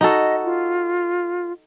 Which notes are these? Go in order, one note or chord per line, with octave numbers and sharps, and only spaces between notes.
D#4 F#4 A4 D#5
F4